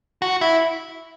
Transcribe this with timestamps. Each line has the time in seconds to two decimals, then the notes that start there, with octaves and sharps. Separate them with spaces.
0.22 F#4
0.41 E4